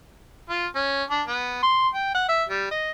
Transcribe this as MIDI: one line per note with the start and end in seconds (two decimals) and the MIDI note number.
0.50 0.67 65
0.75 1.04 61
1.10 1.22 62
1.28 1.59 59
1.63 1.88 84
1.94 2.11 79
2.15 2.25 78
2.29 2.44 76
2.49 2.67 55
2.71 2.91 75